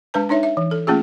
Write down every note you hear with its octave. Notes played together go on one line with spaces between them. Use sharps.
G#3 D4 B4 A5
D4 D#4 C#5 E5
E5
E3
A4
A3 A#3 C#4 F4 G#4